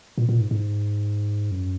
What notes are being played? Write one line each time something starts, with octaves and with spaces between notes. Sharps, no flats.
A#2
A#2
G#2
G#2
F#2